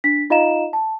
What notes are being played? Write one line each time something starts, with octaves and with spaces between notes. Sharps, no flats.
D4 B6
D#4 F4 D#5 F5 A#5 E7
A5